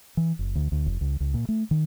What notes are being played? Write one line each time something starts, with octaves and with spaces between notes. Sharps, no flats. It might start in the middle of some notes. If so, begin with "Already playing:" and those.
E3
F#1
D2
D2
F1
C#2
C#2
A#2
A3
D#3